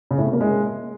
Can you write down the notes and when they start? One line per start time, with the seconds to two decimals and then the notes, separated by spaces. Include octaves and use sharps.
0.11 C#3
0.18 A2
0.26 C3
0.33 A#3
0.41 G#3